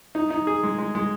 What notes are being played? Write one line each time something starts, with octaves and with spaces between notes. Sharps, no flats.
D#4
D#4
G#4
G#3
G#3
G#3